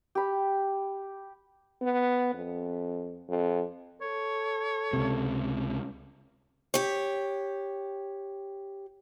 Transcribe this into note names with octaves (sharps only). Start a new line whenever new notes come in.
G4 B5
B3
F2
F2
A4 C#5
C#2 C3
G4 C#5